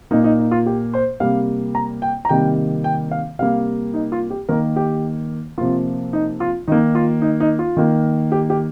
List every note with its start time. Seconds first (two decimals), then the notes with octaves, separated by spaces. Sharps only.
0.11 A#2 A#3 D#4
0.24 D#4
0.39 D#4
0.51 F4
0.66 G4
0.94 C5
1.20 C3 G3 A#3 F5
1.75 A#5
2.02 G5
2.25 A#5
2.29 C3 D#3 G3 A#3 G5
2.84 G5
3.11 F5
3.39 C3 G3 A#3 F5
3.94 D#4
4.12 F4
4.30 G4
4.49 D#3 A#3 A#4
4.76 G4
5.58 C3 F3 A#3 F4
6.13 D#4
6.40 F4
6.68 D#3 A#3 D#4
6.95 F4
7.22 D#4
7.40 D#4
7.59 F4
7.77 D#3 A#3
8.32 G4
8.50 G4